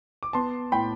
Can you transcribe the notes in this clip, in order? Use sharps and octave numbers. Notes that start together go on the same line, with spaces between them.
D6
B3 A5 C6
A2 G5 B5